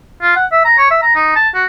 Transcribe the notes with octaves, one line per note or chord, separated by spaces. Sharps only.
F4
F#5
E5
A#5
C#5
E5
A#5
D#4
A5
F#4